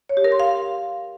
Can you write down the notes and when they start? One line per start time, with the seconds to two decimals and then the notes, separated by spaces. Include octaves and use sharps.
0.09 C#5
0.17 G4
0.24 A#4
0.32 C6
0.40 F5